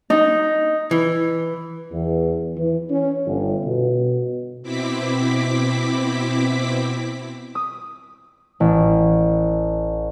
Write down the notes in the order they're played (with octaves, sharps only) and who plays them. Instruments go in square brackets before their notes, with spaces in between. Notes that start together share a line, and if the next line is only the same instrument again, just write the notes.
[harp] D#4
[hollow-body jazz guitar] E3
[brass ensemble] E2
E3
C#4
G1
B2
[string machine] B2 C4 E4 D6 B6
[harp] D#6
A1